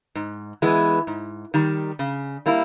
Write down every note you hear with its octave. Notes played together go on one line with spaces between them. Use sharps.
G#2
E3 G#3 B3 E4
G#2
D#3 G3
C#3
G3 A#3 E4